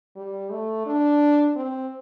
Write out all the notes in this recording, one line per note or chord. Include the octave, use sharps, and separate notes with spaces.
G3
A3
D4
C4